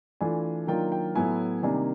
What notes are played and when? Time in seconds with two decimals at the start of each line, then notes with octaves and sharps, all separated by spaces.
0.21 E3 A3 D4 F4 G#5
0.67 D#3 F#3 A#3 D4 F4 G5
0.92 G5
1.15 A2 F#3 B3 E4 G#5
1.63 C3 D#3 G3 A#3 D4 G#5